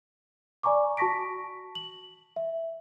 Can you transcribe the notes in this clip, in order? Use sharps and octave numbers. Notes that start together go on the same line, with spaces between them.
D5 G#5 A#5 C#6 D6
F#4 A5 C#6 A#6 B6 D7
F#7
E5